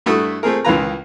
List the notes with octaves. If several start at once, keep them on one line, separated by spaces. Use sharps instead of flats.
G2 A3 E4 F#4 A4 D#6
A3 C4 G#4 A#4
C#2 D#3 E3 F4 B4 A#5